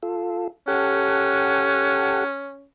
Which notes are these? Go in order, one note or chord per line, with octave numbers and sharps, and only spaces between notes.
F4 A4
C#4 G4 A4 F#5